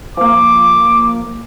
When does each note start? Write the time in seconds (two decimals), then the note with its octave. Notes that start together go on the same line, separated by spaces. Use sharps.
0.17 F3 A#3 D6